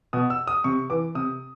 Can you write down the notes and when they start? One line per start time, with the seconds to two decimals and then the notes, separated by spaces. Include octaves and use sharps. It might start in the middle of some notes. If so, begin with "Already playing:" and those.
0.13 B2 D#6
0.30 E6
0.47 D#6
0.64 C3 C#6
0.90 E3 D6
1.15 C3 D#6